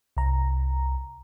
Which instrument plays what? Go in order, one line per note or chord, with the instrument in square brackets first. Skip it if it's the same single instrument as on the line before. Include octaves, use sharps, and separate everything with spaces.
[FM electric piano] C2 A#5